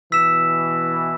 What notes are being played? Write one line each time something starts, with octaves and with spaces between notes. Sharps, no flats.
B2 E3 E6 B6 E7